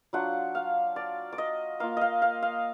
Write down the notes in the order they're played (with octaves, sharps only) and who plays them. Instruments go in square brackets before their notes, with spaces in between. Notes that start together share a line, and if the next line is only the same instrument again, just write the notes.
[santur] F#3 D4 F4 F#5
F5
D5
D5
D#5
A#3 F4 F5
D#5 F5
F5
F5